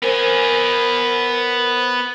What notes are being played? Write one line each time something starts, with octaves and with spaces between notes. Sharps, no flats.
B3 A#4 C5 G#5